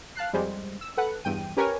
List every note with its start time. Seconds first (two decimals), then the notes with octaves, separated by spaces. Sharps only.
0.16 F5 A5 F#6 C7
0.33 F2 G3 G#3 C5
0.81 E6
0.97 A4 B4 F#5 F#6
1.24 E2 G2 G5 D#7
1.57 C#4 G4 A#4 B4 C#5 G#5